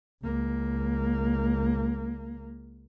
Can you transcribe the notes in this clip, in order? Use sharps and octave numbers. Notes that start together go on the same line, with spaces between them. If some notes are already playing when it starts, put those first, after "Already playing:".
C#2 A#3